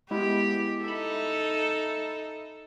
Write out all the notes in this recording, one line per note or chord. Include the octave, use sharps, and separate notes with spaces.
G#3 B3 E4 G4
D#4 A4 E5 B5